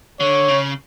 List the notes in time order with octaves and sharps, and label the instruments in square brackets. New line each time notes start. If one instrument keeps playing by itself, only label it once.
[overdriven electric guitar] D3 [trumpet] C#5
[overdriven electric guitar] C#3